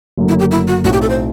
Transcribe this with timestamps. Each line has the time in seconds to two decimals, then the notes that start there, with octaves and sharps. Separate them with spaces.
0.18 F#1 F#2 D3 F#3 A3
0.29 E4
0.39 G4
0.51 E4
0.68 F#4
0.84 B1 A2 F#3 C4 E4 F#4
0.93 G4
1.02 A4
1.10 C5